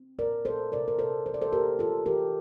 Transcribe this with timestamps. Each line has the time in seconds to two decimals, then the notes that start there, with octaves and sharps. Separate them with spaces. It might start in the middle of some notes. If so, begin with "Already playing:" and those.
Already playing: C4
0.19 A#2 A#4 D5
0.45 A#2 A4 C5
0.72 C3 A#4 D5
0.88 A#4
0.99 C3 A4 C5
1.26 E3 C5
1.34 D5
1.41 A4 C5
1.52 A#3 G4 A#4
1.79 E3 F4 A4
2.06 E3 G4 A#4